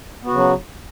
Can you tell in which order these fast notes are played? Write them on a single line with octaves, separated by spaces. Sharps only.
B3 F#4 C#3 F#3